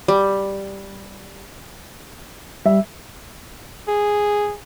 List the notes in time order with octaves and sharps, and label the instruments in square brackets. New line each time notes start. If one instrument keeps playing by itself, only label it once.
[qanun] G3
[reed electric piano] G3 [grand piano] E5
[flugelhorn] G#4